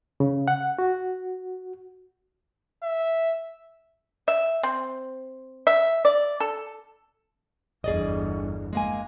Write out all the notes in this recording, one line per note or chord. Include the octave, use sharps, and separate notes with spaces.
C#3
F#5
F#4
E5
E5
C4
E5
D5
A4
G1 E2 G#4 D5 D#5
G#3 A#3 G#5